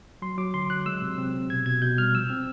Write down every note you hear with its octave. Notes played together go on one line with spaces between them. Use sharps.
F#3 C6
F#3 D6
D3 C6
F#3 F#6
G#3 E6
C3
C4
C3
B2 G#6
B2 G#6
B2 G6
G3 F6
F3 E6
C4